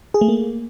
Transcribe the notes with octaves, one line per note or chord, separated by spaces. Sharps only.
G#4
A3
A#3